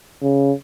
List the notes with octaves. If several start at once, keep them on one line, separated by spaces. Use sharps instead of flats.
C#3